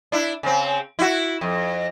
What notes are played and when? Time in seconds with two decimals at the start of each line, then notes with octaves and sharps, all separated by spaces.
0.12 D4 E4
0.43 C#3 C4
0.99 E4 F#4
1.41 F2